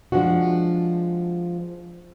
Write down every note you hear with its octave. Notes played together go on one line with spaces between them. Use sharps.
F3 G#3 D4 F#4